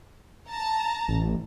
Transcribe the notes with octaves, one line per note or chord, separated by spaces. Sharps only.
A5 A#5
A1